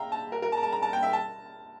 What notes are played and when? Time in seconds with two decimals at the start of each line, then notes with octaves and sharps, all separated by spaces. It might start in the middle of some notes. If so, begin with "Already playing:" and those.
Already playing: E5 F5 G5 A#5
0.12 A5
0.32 A#4
0.42 A#4
0.52 A5
0.57 A#5
0.63 A5
0.73 A#5
0.82 A5
0.93 G5
1.03 E5
1.13 A5